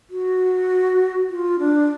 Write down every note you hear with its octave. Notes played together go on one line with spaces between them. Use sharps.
F#4
F4
D4